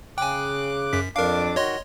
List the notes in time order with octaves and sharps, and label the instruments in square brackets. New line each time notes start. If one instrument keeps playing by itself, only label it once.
[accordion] C#3 D6 F#6 [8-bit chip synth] G5 G#5
[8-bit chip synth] F#2 B6
[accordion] F2 D4 D6 [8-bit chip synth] A#4 F5
[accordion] D#3 F#4 [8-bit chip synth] C#5 D#5 C6